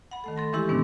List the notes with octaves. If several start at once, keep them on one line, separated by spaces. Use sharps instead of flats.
F#5 B5
D#3 A3 A4
A4 C6 A#6
E3 G#3 C#4 E4 G4 A4
G#2 C3 D#3 B3 C#4 D4